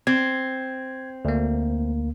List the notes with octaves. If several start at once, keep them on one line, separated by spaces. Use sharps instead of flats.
C4 G#6
D2 A#3